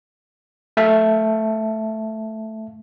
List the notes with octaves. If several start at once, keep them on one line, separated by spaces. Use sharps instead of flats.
A3 E5 F5 A5